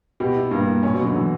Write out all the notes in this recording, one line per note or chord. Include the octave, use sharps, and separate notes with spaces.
B2 G4
E4
G2 A#3
A#3
A#2 C#4
B2
F#3
D3
E3 F#3